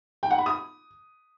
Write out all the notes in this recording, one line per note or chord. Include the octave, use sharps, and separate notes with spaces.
G5
F#5
B5
D#6